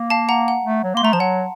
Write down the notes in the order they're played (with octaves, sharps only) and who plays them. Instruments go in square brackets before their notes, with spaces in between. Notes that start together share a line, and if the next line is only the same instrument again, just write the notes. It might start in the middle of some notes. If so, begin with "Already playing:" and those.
Already playing: [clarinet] A#3
[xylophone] F5 A5
F#5 A#5
F#5
[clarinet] A3
F#3
[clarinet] A#3 [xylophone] C6
[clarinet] A3 [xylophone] A#5
[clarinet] F3 [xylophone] A5
[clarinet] F#3 [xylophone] F#5